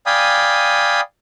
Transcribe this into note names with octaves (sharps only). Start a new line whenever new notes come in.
D5 F5 G5 G#5 B5 D#6